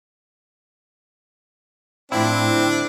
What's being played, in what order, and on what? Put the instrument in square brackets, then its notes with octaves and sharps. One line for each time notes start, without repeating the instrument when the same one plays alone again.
[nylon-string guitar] A2 F3 F4 [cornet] C4 [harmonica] D4 [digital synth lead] E4
[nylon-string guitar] D3